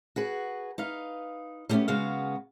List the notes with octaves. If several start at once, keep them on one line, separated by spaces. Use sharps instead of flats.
F#4 G#4 B4
D#4 B4 F5
G3 A3 B3 C#4 G4
C#3 G#3 B3 F#4 F5